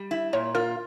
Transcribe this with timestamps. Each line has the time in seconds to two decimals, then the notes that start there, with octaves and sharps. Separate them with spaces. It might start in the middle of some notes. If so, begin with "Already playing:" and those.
Already playing: G3
0.11 E4
0.33 A#2 C#5
0.55 F4 A#4